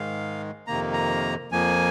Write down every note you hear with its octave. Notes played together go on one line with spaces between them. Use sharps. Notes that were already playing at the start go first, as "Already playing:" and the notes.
Already playing: G#2 D#3 G#3 F5
F2 C3 D#3 A#3 A#5
A#5
F2 F3 A#3 G#5